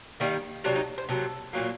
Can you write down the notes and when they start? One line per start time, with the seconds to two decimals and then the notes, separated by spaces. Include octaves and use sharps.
0.20 D#3 G3 A#3 D#4
0.64 C3 F#3 A#3 D4
0.76 D#4
0.98 C5
1.09 C3 F#3 A#3 A4
1.53 A#2 F#3 A#3